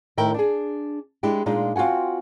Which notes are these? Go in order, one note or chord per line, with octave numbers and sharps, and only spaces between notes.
A2 D#3 E4 A#4 G5
D4 G#4
G#3 D4 E4 G4
A#2 G#3 D4 D#4 F4
C4 F4 F#4 F#5 G#5